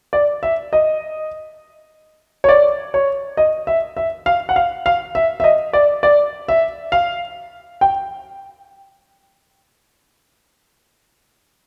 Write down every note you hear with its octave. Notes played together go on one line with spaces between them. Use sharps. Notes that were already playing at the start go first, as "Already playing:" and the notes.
D5
E5
D#5
C#5
D5
C#5
D#5
E5
E5
F5
F#5
F5
F5
E5
E5
D#5
D5
D5
E5
F5
G5